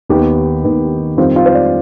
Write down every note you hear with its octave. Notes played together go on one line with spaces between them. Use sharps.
D#2 D#3 B3 G4
D#2 D#3 B3
F2 D#3 G3 C4 F4
F4
C5
D5